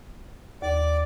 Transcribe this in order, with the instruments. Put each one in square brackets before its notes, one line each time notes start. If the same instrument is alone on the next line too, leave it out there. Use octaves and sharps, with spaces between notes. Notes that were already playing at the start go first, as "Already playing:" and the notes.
[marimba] D#2 [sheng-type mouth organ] D5 D6